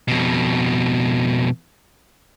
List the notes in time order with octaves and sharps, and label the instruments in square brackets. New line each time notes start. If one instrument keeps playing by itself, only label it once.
[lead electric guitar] F2 B2